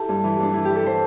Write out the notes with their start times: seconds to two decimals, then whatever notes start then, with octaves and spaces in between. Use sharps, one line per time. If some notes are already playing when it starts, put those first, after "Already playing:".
Already playing: E4 G4 A4
0.09 G2
0.24 E3
0.39 G2 D4
0.53 E3 E4
0.65 G4
0.70 E3
0.76 A4
0.86 E3 C5